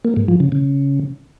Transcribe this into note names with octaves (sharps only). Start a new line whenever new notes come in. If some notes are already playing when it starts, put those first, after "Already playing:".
A#3
G#2
F3
C#3
C#3